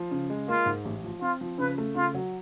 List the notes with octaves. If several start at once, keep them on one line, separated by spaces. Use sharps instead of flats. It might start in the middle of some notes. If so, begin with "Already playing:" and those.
Already playing: F3
C#3
G#3
A#3 F4
G#2
A1
F3
C4 F4
F3
C#3 B4
A3
C#3 F4
F#3